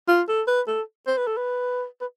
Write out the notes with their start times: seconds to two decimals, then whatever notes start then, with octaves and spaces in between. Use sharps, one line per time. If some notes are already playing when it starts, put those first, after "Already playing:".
0.08 F4
0.29 A4
0.47 B4
0.68 A4
1.07 C5
1.17 B4
1.27 A4
1.37 B4
2.01 B4